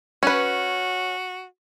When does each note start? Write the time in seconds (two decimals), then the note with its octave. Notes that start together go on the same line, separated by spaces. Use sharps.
0.23 C#4 F#4 B4